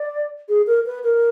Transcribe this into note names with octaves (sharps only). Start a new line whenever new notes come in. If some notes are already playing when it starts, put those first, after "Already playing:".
Already playing: D5
G#4
A#4
B4
A#4